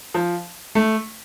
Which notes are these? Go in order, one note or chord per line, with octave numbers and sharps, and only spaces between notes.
F3
A3